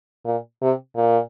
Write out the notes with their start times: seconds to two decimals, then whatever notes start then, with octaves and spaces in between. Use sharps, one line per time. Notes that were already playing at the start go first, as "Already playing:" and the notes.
0.25 A#2
0.62 C3
0.96 A#2